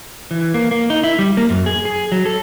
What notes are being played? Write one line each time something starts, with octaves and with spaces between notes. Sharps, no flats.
E3
A#3
A#3
D#4
E4
G3
A#3
F#2
G#4
G#4
F#3
A4